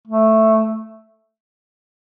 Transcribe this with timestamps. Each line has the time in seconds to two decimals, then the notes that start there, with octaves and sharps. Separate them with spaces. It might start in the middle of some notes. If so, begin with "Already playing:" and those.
0.07 A3